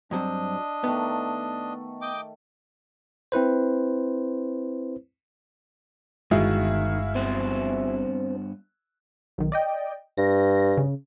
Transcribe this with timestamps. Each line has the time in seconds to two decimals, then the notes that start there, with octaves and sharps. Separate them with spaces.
0.11 G2 F#3 C4 D4 D#5
0.84 D#3 A3 B3
2.01 D#5 G5 D6
3.32 C4 E4 B4 C5
6.31 G1 D#3 G#3 E4 F#4 G#4 F5
7.15 G2 B3 C4 C5
9.38 B1 D#3
9.52 D5 D#5 G5
10.17 G2 A#6
10.77 C#3